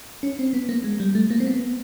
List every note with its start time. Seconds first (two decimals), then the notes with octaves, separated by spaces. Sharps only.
0.23 C#4
0.39 C4
0.53 B3
0.69 A#3
0.84 G#3
1.00 G3
1.15 A3
1.30 A#3
1.40 C4
1.47 B3